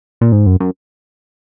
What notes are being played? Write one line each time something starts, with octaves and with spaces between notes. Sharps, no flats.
A#2
G#2
F#2
F#2